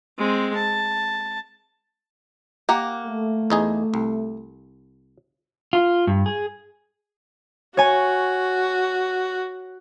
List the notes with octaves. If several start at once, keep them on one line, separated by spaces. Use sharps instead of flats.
G#3 C4
A5
A#3 G4 A#4 F#5
A3
E2 D#4 G#4
C2
F4
G2
G#4
F#4 C#5 G#5